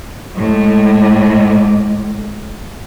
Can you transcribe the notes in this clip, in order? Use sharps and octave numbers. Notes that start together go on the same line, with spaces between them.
A2 G#3